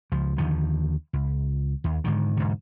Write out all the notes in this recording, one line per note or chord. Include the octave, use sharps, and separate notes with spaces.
C#2 F3
D#2 D3 D#3 F3
C#2
D#2
G#2 D3 D#3
E1 G#2 D3